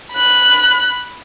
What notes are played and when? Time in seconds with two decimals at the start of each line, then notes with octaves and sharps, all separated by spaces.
0.13 B5 F#6